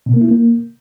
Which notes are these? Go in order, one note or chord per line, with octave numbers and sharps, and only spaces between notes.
B2
A#3
E4
A#3